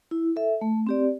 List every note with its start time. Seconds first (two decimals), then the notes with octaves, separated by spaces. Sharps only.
0.11 E4
0.36 A4 E5
0.61 A3
0.87 C4 G4 D5